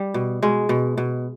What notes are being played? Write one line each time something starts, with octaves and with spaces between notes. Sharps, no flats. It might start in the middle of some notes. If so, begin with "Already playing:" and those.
Already playing: G3
B2
B2 G#3
B2
B2